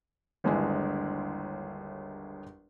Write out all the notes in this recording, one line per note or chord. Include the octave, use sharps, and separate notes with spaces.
G1 D#2 G#3 D4 E4 G#5